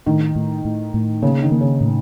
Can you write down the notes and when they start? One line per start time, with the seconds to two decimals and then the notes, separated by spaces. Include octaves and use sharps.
0.06 A2 D#3
0.36 A2
0.65 A2
0.94 A2
1.22 C#3 A#3
1.42 D#3
1.52 A#3
1.61 C#3
1.81 A2